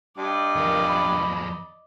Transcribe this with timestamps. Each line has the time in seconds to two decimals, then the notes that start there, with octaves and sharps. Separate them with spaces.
0.18 G2 D5 D#5
0.55 E2 F3 A#4
0.88 B5